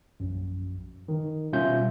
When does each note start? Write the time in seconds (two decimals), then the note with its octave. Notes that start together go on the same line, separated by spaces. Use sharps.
0.20 A#1 F#2
1.08 D#3
1.53 B2 G3 C#4 F4 E5 G6